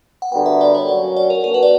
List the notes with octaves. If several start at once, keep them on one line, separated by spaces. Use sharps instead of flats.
F#5
D3 G3 B3 F#4 A#4 G5
E5
D5
C#5
F#3 A#3 C#4 F#4 D5
D5
A#4
A#3 D4 F#4 A#4
B4
D5